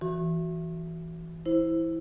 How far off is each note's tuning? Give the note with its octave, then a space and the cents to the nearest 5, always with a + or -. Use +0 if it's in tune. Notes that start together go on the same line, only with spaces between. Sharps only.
E3 +0 F#4 +0 C#6 -40
E4 -5 C5 +0